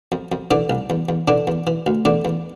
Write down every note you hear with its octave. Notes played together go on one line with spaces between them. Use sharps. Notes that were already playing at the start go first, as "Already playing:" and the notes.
F2
F2
D3 E3 D4
C2
E2
E2
D3 E3 D4
E2
E3
D2
E2 D3 D4
E2